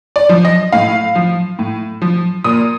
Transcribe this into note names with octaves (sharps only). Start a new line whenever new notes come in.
D5
F3
D#5
A2 F5
F3
A2
F3
A#2 D#6